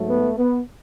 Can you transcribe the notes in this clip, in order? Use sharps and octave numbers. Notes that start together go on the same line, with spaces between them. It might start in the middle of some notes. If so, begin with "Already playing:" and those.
Already playing: G#2 F#3 A3
B3
B3